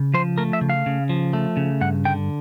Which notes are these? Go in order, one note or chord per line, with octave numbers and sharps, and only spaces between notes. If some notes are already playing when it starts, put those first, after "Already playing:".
Already playing: C#3
F3 C5
A3 A#4
E5
C#3
F5
C#3
F3
A3
C#3
G2 F#5
D3 G5